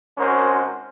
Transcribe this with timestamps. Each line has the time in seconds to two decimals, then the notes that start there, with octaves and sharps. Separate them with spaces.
0.18 G#1 G#3 C#4 F#4 A#4 C5